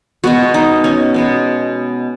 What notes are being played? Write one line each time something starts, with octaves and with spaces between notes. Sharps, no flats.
B2 G#3 B3 F#4
D#4
C#4
B2 G#3 B3